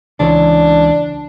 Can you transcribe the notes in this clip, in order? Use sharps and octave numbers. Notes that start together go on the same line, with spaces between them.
C#2 E3 D4 C#5